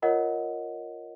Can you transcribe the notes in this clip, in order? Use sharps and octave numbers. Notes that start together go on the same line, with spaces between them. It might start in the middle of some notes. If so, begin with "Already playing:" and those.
F4 A#4 C#5 D#5 F#5